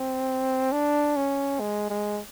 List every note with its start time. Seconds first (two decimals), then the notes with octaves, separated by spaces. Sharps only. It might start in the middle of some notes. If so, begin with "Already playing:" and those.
Already playing: C4
0.72 D4
1.17 C#4
1.60 G#3
1.90 G#3